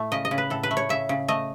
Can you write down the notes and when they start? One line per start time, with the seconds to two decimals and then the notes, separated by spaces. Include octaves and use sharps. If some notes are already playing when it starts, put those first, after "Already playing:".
Already playing: A2 A3
0.12 C#3 D#5
0.25 D#5
0.31 C#3
0.38 B4
0.50 A2 A4
0.63 B4
0.71 A3
0.77 C#5
0.89 C#3 E5
1.09 C#3
1.28 A3 D#5